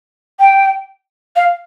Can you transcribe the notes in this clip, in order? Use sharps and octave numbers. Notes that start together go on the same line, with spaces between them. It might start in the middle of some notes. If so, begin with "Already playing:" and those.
G5
F5